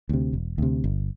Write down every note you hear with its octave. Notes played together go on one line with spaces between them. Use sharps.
D2 C3
E1
D2 C3
G1